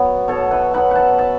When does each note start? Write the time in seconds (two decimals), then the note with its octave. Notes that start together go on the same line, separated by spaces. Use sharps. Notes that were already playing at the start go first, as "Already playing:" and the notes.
Already playing: B2 F#3 B3 C#5
0.28 B2 A4 C#5
0.51 B4 E5
0.74 F#3 B3 F#5 B5
0.91 E5 F#5 A5
1.18 E5 A5